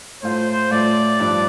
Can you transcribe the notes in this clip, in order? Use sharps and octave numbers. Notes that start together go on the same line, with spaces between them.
A2 A3 F4 C5
A2 A3 F4 D5
G2 F3 D4